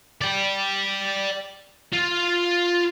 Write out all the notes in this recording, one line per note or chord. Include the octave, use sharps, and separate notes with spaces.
D5 G5
F4 F5